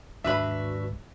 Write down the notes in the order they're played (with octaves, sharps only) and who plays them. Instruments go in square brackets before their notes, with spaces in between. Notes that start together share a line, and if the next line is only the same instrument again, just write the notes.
[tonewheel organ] D#2 G#2 [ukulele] D4 B4 B5 [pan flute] F#4 [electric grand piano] E5